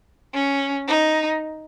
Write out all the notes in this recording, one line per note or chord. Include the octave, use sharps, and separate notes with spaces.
C#4
D#4